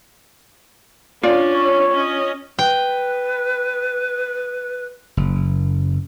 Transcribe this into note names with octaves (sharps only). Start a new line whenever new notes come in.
C#4 D4 F4 D5
C#5
C#4 D#5
B4 G5
F#1